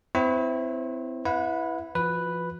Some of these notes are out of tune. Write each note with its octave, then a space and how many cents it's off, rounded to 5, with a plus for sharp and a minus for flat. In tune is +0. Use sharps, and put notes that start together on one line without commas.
C4 -30 E4 +0 C#5 -45
E4 +0 B4 +0 F#5 -35
F3 -25 F#4 -45 B4 +0